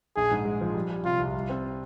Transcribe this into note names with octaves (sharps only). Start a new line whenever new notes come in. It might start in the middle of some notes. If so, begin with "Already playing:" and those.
A#1 G#4
G#2
G#3
F3
G3
G3
C3 F4
C2
G3
C4